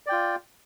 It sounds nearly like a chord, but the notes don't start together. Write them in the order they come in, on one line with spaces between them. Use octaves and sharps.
D5 G5 F4